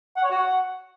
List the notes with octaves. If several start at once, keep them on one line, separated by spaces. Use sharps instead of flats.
F#5
C#5
F#4
F#5